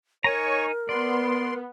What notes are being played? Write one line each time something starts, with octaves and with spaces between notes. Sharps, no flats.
D#4 A#4 C#5 G#5 A#5 C#6
B3 D5 C6